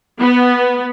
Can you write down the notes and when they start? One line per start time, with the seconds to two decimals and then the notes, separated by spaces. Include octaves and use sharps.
0.19 B3